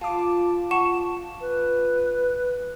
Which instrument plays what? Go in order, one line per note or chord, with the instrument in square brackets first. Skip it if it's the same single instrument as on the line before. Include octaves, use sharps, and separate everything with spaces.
[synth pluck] F4 D6 [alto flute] A5
[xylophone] F#5 C#6 E7 [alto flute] A5
[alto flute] B4